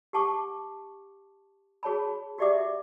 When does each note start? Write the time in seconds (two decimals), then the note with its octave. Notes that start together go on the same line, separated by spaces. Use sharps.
0.13 G4 F#5 A5 C#6 D6
1.83 F#4 G#4 C#5 A5 B5
2.38 F#4 G4 D5 E5 F#5 D6